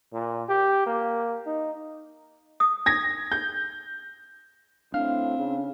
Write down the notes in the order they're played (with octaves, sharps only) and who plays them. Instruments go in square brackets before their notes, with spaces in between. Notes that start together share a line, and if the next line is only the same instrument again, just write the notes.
[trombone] A#2
G4
A#3
D#4
[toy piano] D#6
[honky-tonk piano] G#6 A#6
G6
[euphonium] A2 [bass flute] C4 [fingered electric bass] D4 [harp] F5
[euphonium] C#3